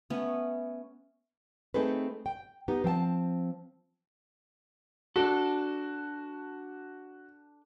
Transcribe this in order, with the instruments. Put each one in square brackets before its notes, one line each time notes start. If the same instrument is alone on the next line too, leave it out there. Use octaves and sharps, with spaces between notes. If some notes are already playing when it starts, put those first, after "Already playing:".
[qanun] A3 B3 C#4
[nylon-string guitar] A3 C4 D#4 G#4 A4 B4
G5
B3 D#4 G4
F3 C4 G5 A5
[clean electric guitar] D4 A4 [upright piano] F#4